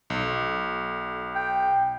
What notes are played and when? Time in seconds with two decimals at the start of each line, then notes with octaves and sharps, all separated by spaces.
0.10 B1
1.35 G5